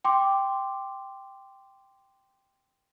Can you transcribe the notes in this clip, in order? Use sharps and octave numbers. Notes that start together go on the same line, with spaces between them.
G5 C6 D6